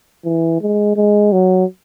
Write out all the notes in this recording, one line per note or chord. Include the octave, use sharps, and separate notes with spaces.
E3
G#3
G#3
F#3